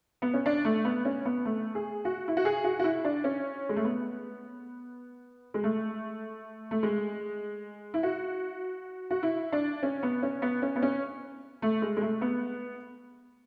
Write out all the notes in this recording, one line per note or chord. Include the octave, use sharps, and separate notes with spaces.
B3
C#4
D4
A3
B3
C#4
B3
A3
G#4
F#4
E4
F#4
G#4
F#4
F#4
E4
D4
C#4
G#3
A3
B3
G#3
A3
A3
G#3
E4
F#4
F#4
E4
D4
C#4
B3
C#4
B3
C#4
B3
C#4
A3
G#3
G#3
A3
B3